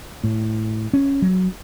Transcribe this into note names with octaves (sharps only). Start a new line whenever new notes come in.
A2
C#4
F#3